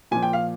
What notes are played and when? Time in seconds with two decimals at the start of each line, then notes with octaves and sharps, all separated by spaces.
0.11 A#2 F3 G#5
0.23 G5
0.33 F5